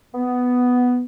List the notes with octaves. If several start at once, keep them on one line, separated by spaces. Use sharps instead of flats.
B3